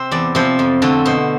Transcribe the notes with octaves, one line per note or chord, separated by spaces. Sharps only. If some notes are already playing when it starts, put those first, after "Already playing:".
Already playing: C3 C4 C5
E2 D5
C3 F3 C5
F2
D3 A3 C4
B2 C5